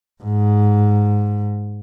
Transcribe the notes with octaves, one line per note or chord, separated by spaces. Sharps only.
G#2